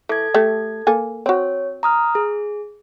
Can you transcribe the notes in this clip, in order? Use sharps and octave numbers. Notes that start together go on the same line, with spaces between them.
E3 A4 G#6
A3 G4
A#3 A4 G#5
C4 F#4 C#5
A#5 D#6 F6
G#4